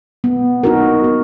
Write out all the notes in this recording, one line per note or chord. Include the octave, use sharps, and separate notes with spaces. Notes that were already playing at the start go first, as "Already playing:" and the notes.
B3
D#4 F#4 A#4
B3